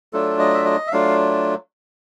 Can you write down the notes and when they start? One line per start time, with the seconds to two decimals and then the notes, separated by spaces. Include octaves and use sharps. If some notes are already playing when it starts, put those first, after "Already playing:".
0.13 F#3 A3 D4 F4 A4
0.39 D#5
0.54 E5
0.65 D#5
0.87 E5
0.92 F#3 A3 D4 F4 F5